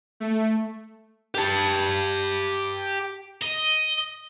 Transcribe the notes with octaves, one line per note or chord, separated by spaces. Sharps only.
A3
G4 A5
D#5